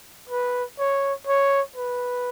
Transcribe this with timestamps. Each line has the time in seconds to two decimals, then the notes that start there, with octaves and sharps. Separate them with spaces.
0.30 B4
0.80 C#5
1.27 C#5
1.76 B4